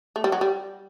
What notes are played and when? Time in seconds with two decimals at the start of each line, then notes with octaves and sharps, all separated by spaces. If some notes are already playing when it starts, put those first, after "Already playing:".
0.16 A3
0.24 G3
0.32 F#3
0.41 G3